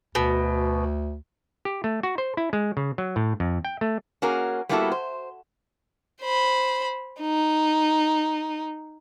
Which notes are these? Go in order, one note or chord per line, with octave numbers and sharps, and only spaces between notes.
D2 B2
G4
A3
F#4
C5
E4
G#3
C#3
F#3
A2
F2
G5
A3
A#3 C#4 F#4 G#4 A#4
G3 A#3 B3 E4 F#4 A4
C5
C5 B5
D#4